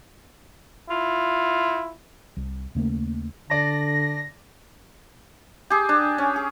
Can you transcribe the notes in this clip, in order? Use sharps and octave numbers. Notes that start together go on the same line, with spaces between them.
E4 F4
C2
D#2 C#3 A3 A#3
D3 D5 A5 A#6
G4 G#4
D4
C#4
G#4